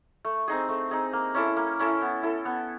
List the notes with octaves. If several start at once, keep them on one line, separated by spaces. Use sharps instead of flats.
A3
C4 D#4 G#4
A3
C4 D#4 G#4
A#3
C#4 E4 A4
A#3
C#4 E4 A4
B3
E4 A4
B3